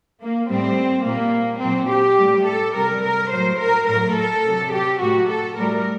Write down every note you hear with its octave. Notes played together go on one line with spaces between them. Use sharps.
A#3
A2 G3 C4
A#2 G3 A#3
A#2 F#3 C4
G4
A2 G3
A4
C3 G3 A#4
A#4
A2 F#3 C5
A#4
A2 F#3 A#4
A4
C3 F#3
G4
A2 F#3 F#4
A4
A2 G3 A#4